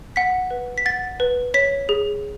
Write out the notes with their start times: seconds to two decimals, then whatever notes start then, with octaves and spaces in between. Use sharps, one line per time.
0.16 F#5 B6
0.51 B4
0.78 B6
0.85 F#5 A6
1.20 B4
1.54 C#5 B6
1.89 G#4